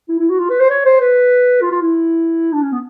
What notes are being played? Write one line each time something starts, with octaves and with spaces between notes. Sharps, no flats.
E4
E4
F#4
F4
B4
C5
C#5
C5
B4
F4
F4
E4
D4
C#4
B3